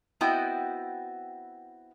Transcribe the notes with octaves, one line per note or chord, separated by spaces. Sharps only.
B3 C4 E4 F#4 D#5 G5